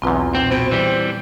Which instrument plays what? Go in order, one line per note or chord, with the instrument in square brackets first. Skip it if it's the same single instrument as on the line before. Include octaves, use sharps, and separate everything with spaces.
[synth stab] B1 E2 [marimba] C4 F4 B4
[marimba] A#2 [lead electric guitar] C4
[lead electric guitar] B2 [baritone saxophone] C4
[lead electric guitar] E3 G3